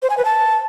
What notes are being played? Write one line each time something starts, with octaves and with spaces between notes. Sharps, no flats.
C5
G#5
B4
A5